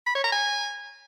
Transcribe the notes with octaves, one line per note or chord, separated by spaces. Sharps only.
B5
C#5
A#5
G#5